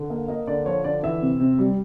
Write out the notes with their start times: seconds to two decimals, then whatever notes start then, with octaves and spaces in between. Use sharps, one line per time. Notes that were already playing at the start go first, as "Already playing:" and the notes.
Already playing: D3
0.10 A#3
0.28 A#3 D#5
0.47 D3 D5
0.65 F3 C#5
0.84 D3 D5
1.03 E3 E5
1.22 C3
1.40 C3
1.59 G3